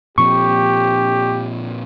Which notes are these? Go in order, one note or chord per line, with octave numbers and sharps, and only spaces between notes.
A#2 F3 C4 G4 C#6